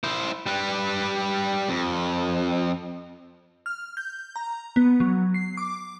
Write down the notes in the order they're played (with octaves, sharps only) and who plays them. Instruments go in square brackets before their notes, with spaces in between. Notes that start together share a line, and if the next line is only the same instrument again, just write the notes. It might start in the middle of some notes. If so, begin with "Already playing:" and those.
[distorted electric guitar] E4 C5
G3 B4
F2
[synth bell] F6
G6
A#5
B3
F#3
C7
D6